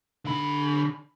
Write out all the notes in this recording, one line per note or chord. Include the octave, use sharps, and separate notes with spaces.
D3 B5